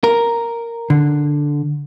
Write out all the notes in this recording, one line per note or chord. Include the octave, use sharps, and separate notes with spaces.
A#4
D3